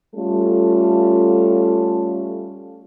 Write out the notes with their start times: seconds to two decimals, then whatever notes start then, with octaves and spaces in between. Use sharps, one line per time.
0.14 G3 A3 C#4 F4 A4